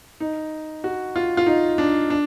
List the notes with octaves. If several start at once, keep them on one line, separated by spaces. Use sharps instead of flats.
D#4
F#4
F4
F4
D#4
D4
D4